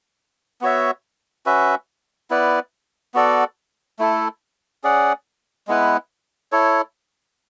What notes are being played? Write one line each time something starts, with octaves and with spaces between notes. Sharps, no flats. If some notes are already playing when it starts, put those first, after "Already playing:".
B3 F#4 C#5 E5
C#4 F#4 B4 E5
B3 E4 B4 D5
B3 F#4 A4 D5
A3 E4 A4
C#4 G#4 D5 F#5
G#3 B3 E4 B4
E4 A4 C#5